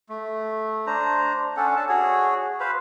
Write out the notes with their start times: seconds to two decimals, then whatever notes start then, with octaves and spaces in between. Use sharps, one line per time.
0.09 A3
0.87 D4 C5 A#5
1.57 C#4 D4 A4 F#5
1.76 D4 A4 A5
1.89 F#4 G#4 C#5
2.60 B4 C5 F5 B5